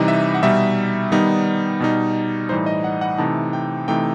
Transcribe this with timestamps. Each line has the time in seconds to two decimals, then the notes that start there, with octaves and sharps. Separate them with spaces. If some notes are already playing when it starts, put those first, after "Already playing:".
Already playing: C3 E3 G3 D#4 D#5
0.08 E5
0.34 F#5
0.43 B2 G3 D#4 E5
1.12 D#3 G3 B3 D#4
1.80 B2 G3 D#4
2.49 A2 E3 G3 D#4 C5
2.66 D#5
2.84 F#5
3.01 F#5
3.18 C3 E3 A3 D#4 A5
3.53 G5
3.88 C3 E3 A3 D#4 G5